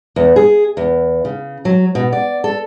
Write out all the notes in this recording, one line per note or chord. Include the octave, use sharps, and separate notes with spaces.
E2
G#4
E2
C#3
F#3
B2
D5
A4